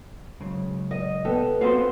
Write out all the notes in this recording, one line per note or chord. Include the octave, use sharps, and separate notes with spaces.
C#2 F#2 C#3
D#5
B3 G4 A4
B3 C4 F4 F#4 C5